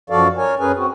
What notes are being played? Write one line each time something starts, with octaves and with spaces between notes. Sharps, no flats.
F#2 F3 F#4 A4 D5 F5
A#4 C#5 G#5
F#2 C#4 G#4 A#4 B4 G#5
C4 F#4